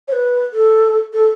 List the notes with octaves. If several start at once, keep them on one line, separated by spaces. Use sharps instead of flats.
C#5
B4
A4
A4